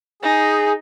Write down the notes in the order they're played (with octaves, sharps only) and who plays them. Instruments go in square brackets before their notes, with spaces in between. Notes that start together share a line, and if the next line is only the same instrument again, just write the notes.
[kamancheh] D#4 [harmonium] G#4